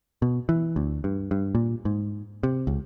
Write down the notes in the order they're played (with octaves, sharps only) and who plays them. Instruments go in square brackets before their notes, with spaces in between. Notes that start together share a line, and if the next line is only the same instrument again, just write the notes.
[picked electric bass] B2
E3
D2
G2
G2
A#2
G#2
C3
C#2